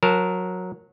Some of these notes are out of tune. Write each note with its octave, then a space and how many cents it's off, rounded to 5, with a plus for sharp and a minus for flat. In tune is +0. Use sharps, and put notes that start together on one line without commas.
F#3 -20 A#4 +0 A5 -10